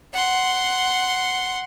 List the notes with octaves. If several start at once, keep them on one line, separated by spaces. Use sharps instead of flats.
F#5 C6